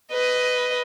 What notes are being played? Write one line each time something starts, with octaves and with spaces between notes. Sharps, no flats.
B4 D#5